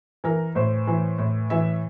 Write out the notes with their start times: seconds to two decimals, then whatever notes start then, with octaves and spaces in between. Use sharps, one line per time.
0.24 E3 A#4
0.55 A2 C5
0.87 E3
1.18 A2
1.50 E3 E5